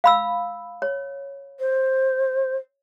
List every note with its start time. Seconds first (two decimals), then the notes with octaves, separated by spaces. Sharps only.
0.04 F5 B5 E6
0.82 C#5
1.60 C5